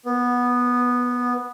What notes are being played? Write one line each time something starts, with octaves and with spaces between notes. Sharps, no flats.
B3